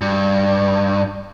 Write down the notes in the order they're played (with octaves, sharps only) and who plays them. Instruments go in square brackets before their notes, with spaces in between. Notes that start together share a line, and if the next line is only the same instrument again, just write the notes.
[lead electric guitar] G2